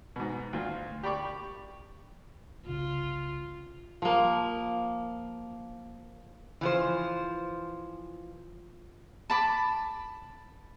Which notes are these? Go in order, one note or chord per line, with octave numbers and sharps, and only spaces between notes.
G#2 B2
D2 F4
G4 D5 B5 C#6 D6
G1 C2 C#3 F4
F3 A#3
E3 F3 C5
A5 B5 D6